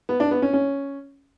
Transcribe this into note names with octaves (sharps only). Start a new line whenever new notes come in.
B3
D4
B3
C#4
C#4